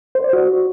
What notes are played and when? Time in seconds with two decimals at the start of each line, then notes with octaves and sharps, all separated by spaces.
0.15 C5
0.24 D5
0.33 F#4